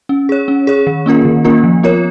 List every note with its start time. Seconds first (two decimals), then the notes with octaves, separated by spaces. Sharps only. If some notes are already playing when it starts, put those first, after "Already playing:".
0.09 C#4
0.29 G#4 C#5
0.48 C#4
0.67 G#4 C#5
0.87 D#3
1.06 A#3 C#4 F4 A#4
1.25 D#3
1.45 A#3 C#4 F4 A#4
1.64 F3
1.83 B3 F4 A#4 C#5